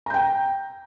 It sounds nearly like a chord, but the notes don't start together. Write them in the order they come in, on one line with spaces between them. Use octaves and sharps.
A#5 G6 G5